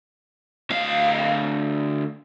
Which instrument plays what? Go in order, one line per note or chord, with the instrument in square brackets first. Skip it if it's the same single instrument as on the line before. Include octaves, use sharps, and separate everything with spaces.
[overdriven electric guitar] D2 F5